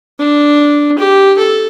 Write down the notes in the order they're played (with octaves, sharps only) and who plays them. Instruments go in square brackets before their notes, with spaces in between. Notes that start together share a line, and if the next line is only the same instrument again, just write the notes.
[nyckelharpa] D4
G4
A4